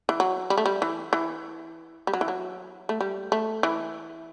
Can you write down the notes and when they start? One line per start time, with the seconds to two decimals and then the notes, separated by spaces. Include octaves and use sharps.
0.09 E3
0.20 F#3
0.50 G3
0.58 A3
0.66 G3
0.82 E3
1.13 E3
2.07 G3
2.13 F#3
2.21 E3
2.28 F#3
2.89 A3
3.01 G3
3.32 A3
3.63 E3